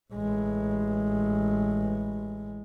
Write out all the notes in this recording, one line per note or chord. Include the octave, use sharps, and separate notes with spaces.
A1 G#3